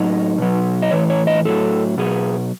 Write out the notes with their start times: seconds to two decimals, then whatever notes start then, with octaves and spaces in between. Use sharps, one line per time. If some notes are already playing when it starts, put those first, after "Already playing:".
Already playing: A2 F#3 D#4
0.38 B2 F#3
0.82 D#5
0.91 A2 E3 C#5
1.10 C#5
1.27 D#5
1.45 A2 F#3 A4
1.98 B2 F#3 G#4